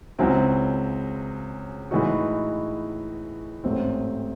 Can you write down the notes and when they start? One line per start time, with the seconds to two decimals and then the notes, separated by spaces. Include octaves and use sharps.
0.18 C#2 C#3 F#3 C4 E4
1.91 A2 E3 G#3 D#4 F#4
3.64 A1 G#2 F#3 A3 C4